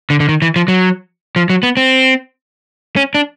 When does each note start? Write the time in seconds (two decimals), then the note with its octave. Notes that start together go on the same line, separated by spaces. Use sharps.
0.10 D3
0.20 D3
0.29 D#3
0.42 E3
0.56 F3
0.68 F#3
1.36 F3
1.50 F#3
1.63 B3
1.77 C4
2.96 C#4
3.15 D4